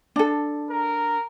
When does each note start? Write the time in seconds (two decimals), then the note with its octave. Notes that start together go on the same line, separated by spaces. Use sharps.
0.16 D4 A4
0.70 A#4